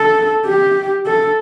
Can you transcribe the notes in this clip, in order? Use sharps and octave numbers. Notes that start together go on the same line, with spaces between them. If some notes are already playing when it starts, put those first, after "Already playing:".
Already playing: A4
G4
A4